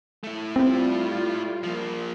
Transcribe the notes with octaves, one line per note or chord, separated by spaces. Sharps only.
A3 E4
G3 C4 F4
F3 A#3